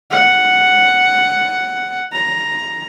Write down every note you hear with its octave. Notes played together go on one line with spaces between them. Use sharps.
F#5
A#5